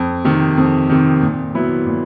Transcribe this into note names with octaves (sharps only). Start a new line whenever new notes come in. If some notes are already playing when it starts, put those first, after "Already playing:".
Already playing: F2
C3 D#3
F2
C3 D#3
A#2
F#3 B3 E4
A#2